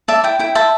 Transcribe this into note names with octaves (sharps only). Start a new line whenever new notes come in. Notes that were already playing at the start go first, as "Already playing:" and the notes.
D5 E5 A5
E4 G5
E4 G5
C5 E5 A5